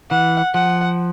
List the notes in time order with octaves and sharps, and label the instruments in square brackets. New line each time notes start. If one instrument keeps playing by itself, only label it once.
[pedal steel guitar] E3 [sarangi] F#5
[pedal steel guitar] F3 [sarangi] F#5